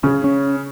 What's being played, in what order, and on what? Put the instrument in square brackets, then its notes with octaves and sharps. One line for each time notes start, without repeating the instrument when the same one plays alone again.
[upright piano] C#3 [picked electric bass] C#4
[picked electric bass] C#4